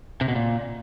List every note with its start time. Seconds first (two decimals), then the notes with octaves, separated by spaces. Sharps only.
0.21 C3
0.28 B2
0.35 A#2